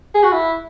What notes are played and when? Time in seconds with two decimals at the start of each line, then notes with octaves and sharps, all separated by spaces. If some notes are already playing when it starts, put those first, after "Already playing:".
0.15 G#4
0.23 F#4
0.32 E4